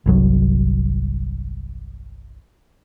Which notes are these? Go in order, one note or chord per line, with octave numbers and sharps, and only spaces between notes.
G1 C2 F#3